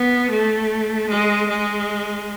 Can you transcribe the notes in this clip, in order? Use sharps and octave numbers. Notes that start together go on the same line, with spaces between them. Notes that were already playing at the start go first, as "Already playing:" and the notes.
Already playing: B3
A3
G#3
G#3